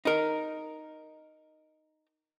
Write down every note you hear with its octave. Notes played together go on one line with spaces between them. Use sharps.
D#4 A#4